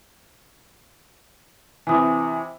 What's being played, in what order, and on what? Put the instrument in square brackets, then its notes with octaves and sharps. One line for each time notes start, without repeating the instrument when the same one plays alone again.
[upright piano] C3 E3 [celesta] G#5 D#6